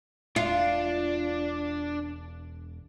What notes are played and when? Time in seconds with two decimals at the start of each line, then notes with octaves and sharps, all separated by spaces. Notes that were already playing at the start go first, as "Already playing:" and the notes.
0.36 E1 D4 F4